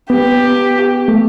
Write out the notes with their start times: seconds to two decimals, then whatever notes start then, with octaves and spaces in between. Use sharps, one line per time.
0.10 B3 G4
1.08 A3